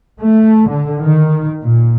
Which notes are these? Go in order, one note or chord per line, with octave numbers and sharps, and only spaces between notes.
A3
D3
D#3
A#2